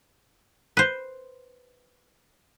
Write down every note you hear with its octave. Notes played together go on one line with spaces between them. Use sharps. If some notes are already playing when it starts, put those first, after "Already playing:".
B4 C5